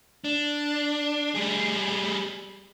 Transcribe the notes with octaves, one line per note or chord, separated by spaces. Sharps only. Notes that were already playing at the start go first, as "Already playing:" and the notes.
D4
G3 G#4